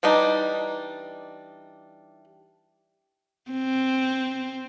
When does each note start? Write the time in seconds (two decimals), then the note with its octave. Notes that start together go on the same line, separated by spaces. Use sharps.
0.03 E3 G3 D4 D#4
3.51 C4